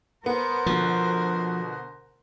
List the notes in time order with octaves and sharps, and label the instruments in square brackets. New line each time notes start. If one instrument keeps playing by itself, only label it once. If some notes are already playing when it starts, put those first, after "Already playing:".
[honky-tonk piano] B3 [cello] A#4 C5
[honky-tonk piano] B2 D3 [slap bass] F3